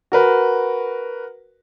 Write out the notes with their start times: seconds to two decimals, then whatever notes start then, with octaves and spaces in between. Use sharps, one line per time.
0.12 F#4 A#4 B4